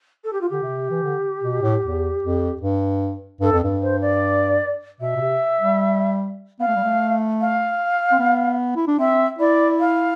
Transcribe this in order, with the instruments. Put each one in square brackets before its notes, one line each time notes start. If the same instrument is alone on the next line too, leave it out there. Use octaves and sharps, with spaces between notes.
[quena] A4
G4
F4
[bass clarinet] D3 [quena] G4
[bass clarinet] C3
E3
D3
B2
A2
E2
F2
G2
[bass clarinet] G2 [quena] A4
[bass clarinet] F2
G2
[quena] C5
D5
[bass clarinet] B2 [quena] E5
[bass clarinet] B2
C3
G3
[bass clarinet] B3 [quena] F5
[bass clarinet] A3
G3
A3
[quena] F5
[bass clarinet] C4
B3
E4
D4
[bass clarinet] C4 [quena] E5
[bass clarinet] E4 [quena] D5
[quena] F5